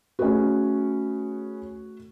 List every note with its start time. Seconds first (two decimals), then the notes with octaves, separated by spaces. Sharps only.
0.19 A3 C#4 F#4 G#4 B4